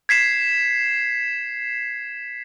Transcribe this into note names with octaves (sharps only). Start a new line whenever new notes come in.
G#6 B6 C7 E7